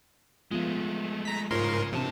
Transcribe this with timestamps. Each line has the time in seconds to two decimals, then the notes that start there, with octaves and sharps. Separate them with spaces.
0.51 F3 G#3 A3 B3 F4
1.25 A#5 B6
1.51 G#2 C#3 F4 A#4 C#5 C6
1.93 A2 C3 E3 C4 D4 A5